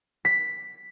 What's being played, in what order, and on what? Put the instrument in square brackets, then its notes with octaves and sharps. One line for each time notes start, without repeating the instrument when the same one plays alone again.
[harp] B6